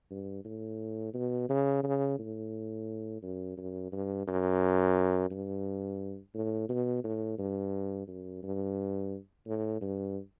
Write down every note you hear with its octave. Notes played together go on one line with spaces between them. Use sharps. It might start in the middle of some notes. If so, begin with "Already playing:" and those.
G2
A2
B2
C#3
C#3
A2
F#2
F#2
G2
F#2
G2
A2
B2
A2
G2
F#2
G2
A2
G2